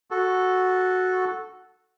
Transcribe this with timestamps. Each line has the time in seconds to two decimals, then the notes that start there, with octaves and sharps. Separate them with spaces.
0.11 F#4 A4